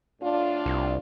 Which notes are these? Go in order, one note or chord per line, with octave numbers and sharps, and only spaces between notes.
A2 D4 F4
C2